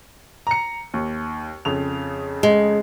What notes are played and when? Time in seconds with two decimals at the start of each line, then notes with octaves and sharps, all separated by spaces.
0.47 A#5 C#7
0.94 D#2
1.65 F2 C#3 F7
2.43 G#3